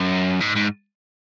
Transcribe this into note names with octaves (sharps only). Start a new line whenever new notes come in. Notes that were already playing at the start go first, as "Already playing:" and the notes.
Already playing: F#2
G#2
G#2